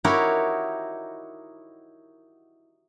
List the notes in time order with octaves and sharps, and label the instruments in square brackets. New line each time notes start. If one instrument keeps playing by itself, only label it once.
[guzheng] D#4 E4 F#4 G4 A#4 C#5